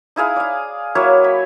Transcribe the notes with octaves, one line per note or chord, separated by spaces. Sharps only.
D#4 E4 G#4 F5
D5 F5
F#3 A#3 E4 C#5
B5